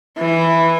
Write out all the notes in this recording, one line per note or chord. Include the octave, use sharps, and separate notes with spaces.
E3